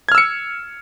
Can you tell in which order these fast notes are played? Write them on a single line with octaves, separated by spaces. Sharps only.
G#6 F6 E6 C#7